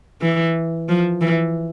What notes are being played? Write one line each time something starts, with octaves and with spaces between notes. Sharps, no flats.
E3
F3
E3